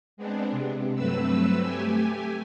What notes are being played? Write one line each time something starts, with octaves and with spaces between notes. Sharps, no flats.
G#3 B3 C4 D4
C3
G2 F#3 A3 C4 B4 E6
A3 G4 G#5